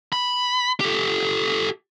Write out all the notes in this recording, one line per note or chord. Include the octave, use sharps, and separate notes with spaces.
B5
G4 A4